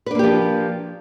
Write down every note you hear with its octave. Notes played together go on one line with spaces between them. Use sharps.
F3 A#3 D4 G4 B4